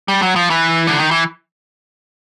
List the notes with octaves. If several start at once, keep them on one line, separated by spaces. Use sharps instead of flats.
G3
F#3
F3
E3
D3
D#3
E3